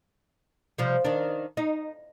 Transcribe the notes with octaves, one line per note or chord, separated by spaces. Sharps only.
C3 F3 G3
D#3 D4
D#4